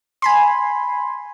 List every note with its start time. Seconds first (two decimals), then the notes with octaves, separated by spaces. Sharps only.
0.22 G#5 B5 C6